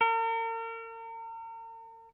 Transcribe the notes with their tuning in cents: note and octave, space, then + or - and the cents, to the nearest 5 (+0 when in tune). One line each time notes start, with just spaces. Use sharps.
A#4 -40